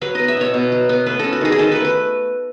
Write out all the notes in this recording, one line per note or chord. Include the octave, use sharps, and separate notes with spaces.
F#3 B4
B3 D#5
E5
B2 C#5
B2
F#3
B3
A3 B4
C#4 A4
F#4
D#3 G#4
G#4
D#3 A4
A3 B4
B4